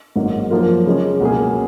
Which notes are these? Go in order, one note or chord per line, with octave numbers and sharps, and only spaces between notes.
G#1 G#2 F#3 A#3 D#4
F#2 F3 A#3 F4 A#4
C#3 G#3 C#4
C#2 B2 A#3 C#4 G#4